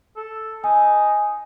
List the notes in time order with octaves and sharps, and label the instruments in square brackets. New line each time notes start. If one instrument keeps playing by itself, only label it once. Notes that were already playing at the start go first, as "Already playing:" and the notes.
[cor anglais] A4
[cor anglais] D#4 [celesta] G#5